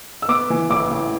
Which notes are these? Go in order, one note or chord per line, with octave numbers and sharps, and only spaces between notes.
E6
B3 D6
E3
A1 D6
A1